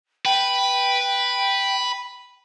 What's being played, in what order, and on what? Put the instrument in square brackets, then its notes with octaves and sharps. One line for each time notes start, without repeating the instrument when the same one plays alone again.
[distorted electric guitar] B4 [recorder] G5